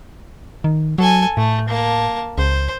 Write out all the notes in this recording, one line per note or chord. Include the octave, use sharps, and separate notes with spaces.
D#3
F#3 A4 G#5
A2 A3
A#3 A5
C#2 C5